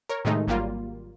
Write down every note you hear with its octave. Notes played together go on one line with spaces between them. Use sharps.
A#4 C#5
A2 C3 D#3 G#3 A3 D#4
G#1 F#3 G3 A#3 F4